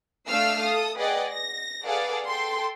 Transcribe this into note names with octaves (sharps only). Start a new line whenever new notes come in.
A3 D4 F5 E6 F6 C7
A4 D#6
G#4 B4 D5 D#5 F#5 G5
A#6
G#4 A4 B4 D5 F5 F#5
A4 G5 C6